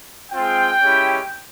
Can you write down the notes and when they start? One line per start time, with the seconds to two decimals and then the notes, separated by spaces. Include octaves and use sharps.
0.32 G#3 C4 F4 G5
0.80 G#3 C#4 E4 G4